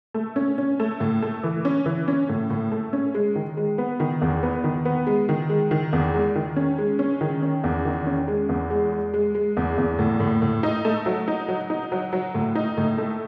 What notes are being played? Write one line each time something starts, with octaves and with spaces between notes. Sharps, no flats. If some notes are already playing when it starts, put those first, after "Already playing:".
A3
C#4
C#4
A3
A2
A3
E3
C#4
E3
C#4
A2
A2
A3
C#4
G#3
D#3
G#3
B3
D#3
E2
B3
D#3
B3
G#3
D#3
G#3
D#3
E2
G#3
D#3
C#4
G#3
C#4
D#3
C#4
E2
D#3
C#4
G#3
E2
G#3
G#3
G#3
G#3
E2
E2
A2
A2
A2
D#4
A3
F#3
D#4
F#3
D#4
F#3
F#3
A2
D#4
A2
A3